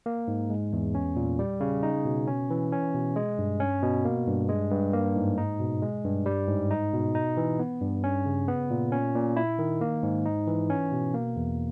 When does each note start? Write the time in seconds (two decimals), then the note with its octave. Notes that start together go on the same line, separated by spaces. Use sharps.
0.06 A#3
0.28 G#2
0.50 G#3
0.73 E2
0.95 C#4
1.16 A#2
1.39 G3
1.60 C#3
1.83 D#4
2.05 B2
2.28 C#4
2.50 E3
2.72 C#4
2.94 B2
3.16 G#3
3.38 G2
3.60 C#4
3.83 B2
4.05 A#3
4.28 G2
4.49 G#3
4.71 G2
4.93 A#3
5.16 G#2
5.38 D#4
5.60 B2
5.82 G#3
6.05 G2
6.26 G3
6.48 G#2
6.71 D#4
6.93 B2
7.15 D#4
7.37 E3
7.59 B3
7.81 G2
8.04 C#4
8.26 C#3
8.48 B3
8.70 A#2
8.92 C#4
9.15 A#2
9.36 E4
9.59 D#3
9.81 A#3
10.03 G#2
10.26 D#4
10.47 E3
10.70 C#4
10.92 B2
11.14 A#3
11.36 E2